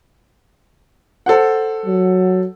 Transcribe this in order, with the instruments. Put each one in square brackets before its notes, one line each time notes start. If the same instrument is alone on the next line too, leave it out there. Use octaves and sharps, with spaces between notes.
[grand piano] A4 C5 F#5
[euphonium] F#3